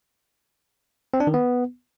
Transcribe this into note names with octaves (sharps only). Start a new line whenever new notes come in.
C4
D4
D#3
B3